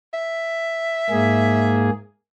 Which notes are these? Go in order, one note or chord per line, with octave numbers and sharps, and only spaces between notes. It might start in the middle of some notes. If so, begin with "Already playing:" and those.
E5
G#2 A#3 G#4